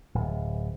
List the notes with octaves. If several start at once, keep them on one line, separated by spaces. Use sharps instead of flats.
D1